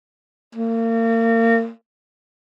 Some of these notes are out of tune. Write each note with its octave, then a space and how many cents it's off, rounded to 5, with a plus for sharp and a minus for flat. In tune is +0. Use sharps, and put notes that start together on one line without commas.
A#3 -35